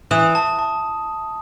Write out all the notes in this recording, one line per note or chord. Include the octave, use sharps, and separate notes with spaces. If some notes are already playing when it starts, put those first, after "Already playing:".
E3 D#6
A5
A5